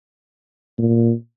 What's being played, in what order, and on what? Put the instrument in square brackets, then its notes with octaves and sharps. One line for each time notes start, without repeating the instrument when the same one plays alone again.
[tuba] A#2